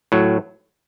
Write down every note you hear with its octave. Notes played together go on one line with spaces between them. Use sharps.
A2 F#3